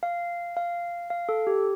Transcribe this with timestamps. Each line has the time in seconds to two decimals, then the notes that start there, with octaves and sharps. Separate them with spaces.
0.03 F5
0.57 F5
1.10 F5
1.29 A4
1.47 G4